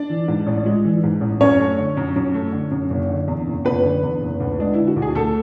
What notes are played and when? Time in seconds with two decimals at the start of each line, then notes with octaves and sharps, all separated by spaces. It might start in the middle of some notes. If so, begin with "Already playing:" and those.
Already playing: D4 D5
0.10 E3
0.28 G#2
0.47 A1
0.66 G#3
0.85 E3
1.03 G#2
1.21 A1
1.41 F#2 C#4 C#5
1.60 A3
1.78 D3
1.97 F#2
2.16 F#2
2.34 A3
2.52 D3
2.71 F#2
2.90 F#1
3.09 D3
3.28 E2
3.47 F#1
3.65 F#1 B3 B4
3.83 D3
4.03 E2
4.21 F#1
4.40 D2
4.58 G#3 D4
4.73 D3 E4
4.87 F#4
4.96 D2
5.02 G#4
5.15 D2 A3 A4